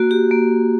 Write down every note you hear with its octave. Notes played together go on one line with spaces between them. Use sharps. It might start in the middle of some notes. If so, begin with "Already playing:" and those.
Already playing: A#3 F#4
G4
A#3